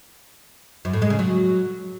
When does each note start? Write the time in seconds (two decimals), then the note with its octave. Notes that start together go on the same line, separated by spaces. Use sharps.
0.85 F#2
0.93 A2
1.02 G#3
1.10 C#3
1.19 F#3